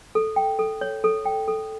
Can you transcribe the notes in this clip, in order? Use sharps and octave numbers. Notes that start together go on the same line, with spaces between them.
A4
G5
A4
C#5
A4
G5
A4